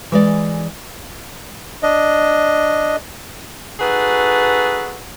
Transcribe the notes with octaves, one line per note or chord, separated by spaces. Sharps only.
E3 G#3 D5
D4 D#5
D#4 F#4 G#4 A4 B4